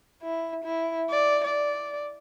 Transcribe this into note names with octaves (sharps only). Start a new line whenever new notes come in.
E4
E4
D5
D5